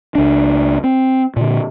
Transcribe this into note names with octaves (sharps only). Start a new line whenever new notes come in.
C#2 D4
C4
A#2 D3